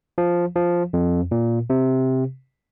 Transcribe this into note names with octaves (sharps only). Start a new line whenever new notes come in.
F3
F3
F2
A#2
C3